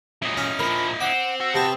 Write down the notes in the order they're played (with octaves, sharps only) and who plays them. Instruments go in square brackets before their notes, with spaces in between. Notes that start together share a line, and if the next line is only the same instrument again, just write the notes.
[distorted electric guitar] F#2 A#2 [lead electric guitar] E4 D#5
[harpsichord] C#4
[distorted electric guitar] A#2 F3 [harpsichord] A#4 [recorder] B5
[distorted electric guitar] C4 [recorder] F#5 [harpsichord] D6
[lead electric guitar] F#4 [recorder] E6
[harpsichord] C3 B3 G4 [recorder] A5